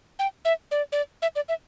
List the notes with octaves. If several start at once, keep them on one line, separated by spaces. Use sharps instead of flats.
G5
E5
D5
D5
E5
D5
E5